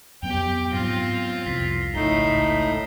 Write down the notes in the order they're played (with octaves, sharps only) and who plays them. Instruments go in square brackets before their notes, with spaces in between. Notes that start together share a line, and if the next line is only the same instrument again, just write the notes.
[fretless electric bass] F2 F#3 B3 [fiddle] G4 G5 [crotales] F7 G7
[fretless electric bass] G#2 F#3 B3 [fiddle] C4 F4 [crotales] F6 A#6
[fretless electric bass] C2 F2 [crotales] B6 C7
[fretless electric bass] G#1 C#2 [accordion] A2 D#4 [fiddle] A3 [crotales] C7 G7